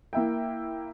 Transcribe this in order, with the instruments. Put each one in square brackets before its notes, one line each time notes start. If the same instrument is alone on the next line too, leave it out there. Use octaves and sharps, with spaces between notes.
[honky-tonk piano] A#3 E4 G5